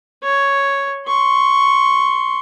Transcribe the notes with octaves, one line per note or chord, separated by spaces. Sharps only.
C#5
C6 C#6